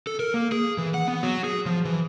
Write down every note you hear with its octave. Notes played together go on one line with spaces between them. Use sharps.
A4
A#4
A#3
G#4
E3
F#5
B3
F#3
G#4
F3
E3